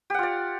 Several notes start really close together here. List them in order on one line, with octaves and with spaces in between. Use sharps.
G4 F#5 F4 D5